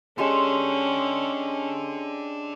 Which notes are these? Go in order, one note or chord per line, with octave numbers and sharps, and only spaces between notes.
G#3 C#4 D4 G4 A4 C6